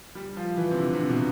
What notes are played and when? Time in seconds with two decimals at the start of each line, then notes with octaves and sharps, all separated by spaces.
0.15 G3
0.37 F3
0.57 E3
0.71 C3
0.78 D3
0.94 C3
1.09 B2